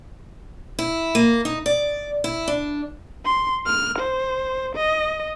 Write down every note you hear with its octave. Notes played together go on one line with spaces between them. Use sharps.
E4
A#3
D#4
D5
E4
D4
C6
F6
C5
D#5